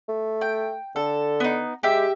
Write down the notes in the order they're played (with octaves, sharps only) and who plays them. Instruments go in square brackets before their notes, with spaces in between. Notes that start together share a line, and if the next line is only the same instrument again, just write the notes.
[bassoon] A3
[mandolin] G5
[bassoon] D3 [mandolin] A4
[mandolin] B3 D#4
[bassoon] G#3 [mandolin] G4 E5